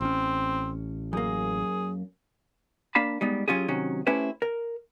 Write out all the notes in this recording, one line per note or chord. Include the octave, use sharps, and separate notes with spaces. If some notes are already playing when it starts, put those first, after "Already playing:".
A1 C4 C#4
F#2 A#3 G#4
A#3 D4 F5 A5 B5
G3 G#3 B3 D#4
F#3 C#4 F4 G4 G#4
C3 D#3 F#3 C#4
A3 C#4 E4 G4 B4 C5
A#4